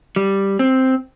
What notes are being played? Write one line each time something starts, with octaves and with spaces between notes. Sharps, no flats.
G3
C4